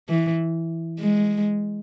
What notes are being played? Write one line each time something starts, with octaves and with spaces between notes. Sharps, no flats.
E3
G#3